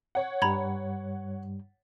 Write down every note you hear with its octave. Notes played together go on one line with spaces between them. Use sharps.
C#5 F#5
G2 G3 A#5 B5 G#6